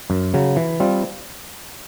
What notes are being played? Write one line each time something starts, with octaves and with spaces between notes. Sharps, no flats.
F#2
C#3 F#3
E3
G3 C4 F4